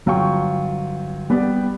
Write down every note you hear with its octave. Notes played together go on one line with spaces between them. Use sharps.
G1 F#3 F4 G5 C#6
G3 B3 G4 D5